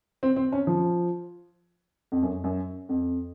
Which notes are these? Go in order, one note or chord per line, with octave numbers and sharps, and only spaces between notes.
C4
C4
C#4
F3
F2
F#2
F#2
F2